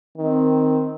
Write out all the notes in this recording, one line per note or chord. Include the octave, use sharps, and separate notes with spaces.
D#3 C4